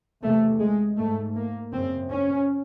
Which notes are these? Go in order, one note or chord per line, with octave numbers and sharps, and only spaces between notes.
E2 C3 A3
G#3
G#2 A3
A#3
F#2 C#3 C4
C#4